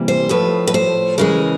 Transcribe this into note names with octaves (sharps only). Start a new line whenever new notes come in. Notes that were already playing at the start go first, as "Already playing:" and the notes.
Already playing: C3 E3 G3 A#3
C5
A2 F3 A3 B4
B4
C5
C#3 E3 G#3 A#4